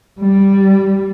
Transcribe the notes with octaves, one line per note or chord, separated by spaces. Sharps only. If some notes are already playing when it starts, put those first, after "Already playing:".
G3